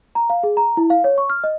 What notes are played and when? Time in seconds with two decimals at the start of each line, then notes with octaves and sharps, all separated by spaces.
0.15 A#5
0.30 F5
0.43 G#4
0.57 A#5
0.77 E4
0.90 F5
1.04 C#5
1.18 C#6
1.30 F6
1.44 D#5